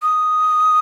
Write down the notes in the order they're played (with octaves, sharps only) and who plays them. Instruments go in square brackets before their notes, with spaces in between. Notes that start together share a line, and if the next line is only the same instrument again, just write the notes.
[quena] D#6